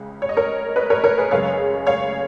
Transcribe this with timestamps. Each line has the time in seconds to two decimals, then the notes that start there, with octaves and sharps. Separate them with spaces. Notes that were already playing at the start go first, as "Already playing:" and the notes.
Already playing: C#2 C#3
0.22 C#5
0.29 D#5
0.37 A#4 C#5
0.76 B4 D#5
0.90 A#4 C#5
1.04 A#4 C#5
1.18 G#4 B4
1.31 F#2 C#3 G#3 C#5 F5
1.87 C#5 F5